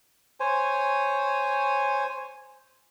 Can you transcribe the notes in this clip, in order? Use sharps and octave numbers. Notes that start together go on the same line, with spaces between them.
C5 C#5 G#5